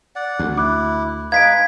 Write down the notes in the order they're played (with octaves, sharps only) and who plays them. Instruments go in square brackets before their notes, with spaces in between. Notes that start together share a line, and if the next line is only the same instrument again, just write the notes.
[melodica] D5 F#5
[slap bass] D2
[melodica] E4 [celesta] D6 F#6
[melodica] G#3 D#4 B4 [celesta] F5 G#5 D7 [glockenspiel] G#6 B6